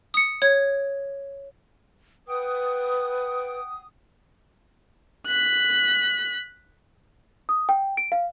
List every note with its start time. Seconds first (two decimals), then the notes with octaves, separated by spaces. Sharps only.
0.14 D#6 C#7
0.42 C#5 G#6
2.28 B4 F#5 G5 D#6
5.27 F#6 B6
7.49 D#6
7.69 G5
7.97 D7
8.12 F5